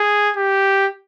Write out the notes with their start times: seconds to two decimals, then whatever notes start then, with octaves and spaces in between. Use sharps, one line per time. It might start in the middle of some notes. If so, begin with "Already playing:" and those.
Already playing: G#4
0.37 G4